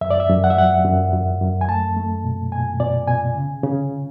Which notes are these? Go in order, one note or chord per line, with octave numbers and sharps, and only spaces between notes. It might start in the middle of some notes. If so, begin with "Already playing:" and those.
F#2 E5
D5
E5
F#2
F#5
E5
F#3 F#5
F#2
F#2
F#2
G#5
A3 A5
A3
B2
B2 G#5
B2 D5
B2 G#5
C#3
C#3